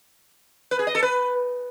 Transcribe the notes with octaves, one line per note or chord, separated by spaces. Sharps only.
B4
G#4
D#5
A4
B4